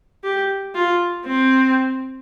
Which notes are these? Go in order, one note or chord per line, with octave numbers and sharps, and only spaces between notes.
G4
F4
C4